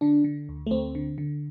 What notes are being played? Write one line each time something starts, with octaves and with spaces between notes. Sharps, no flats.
D3 D4
D3
D2
A3
D2 C4
D3
D3